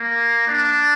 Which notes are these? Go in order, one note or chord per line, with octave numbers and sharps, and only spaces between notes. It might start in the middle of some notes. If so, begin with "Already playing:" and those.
Already playing: A#3
D4